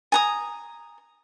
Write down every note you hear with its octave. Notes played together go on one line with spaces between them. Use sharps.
G#5 A#5 D#6